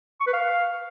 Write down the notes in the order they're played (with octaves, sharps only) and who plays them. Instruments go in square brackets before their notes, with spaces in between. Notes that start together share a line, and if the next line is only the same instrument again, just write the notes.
[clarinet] C#6
B4
F5